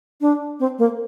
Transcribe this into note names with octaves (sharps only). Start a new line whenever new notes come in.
D4
C4
A#3